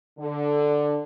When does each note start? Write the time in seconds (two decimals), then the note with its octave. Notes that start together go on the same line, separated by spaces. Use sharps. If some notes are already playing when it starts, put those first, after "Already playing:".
0.19 D3